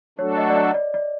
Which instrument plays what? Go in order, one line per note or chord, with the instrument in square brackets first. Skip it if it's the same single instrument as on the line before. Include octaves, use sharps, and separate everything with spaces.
[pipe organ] F#3 A3 D4 F#4 A4 [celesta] C#5
[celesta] D#5
D5
D#5
D5
D5